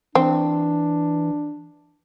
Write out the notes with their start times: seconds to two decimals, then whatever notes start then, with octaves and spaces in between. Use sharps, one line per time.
0.15 E3 C4 D4